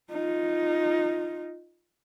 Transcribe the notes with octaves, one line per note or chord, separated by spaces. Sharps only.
D#4 F4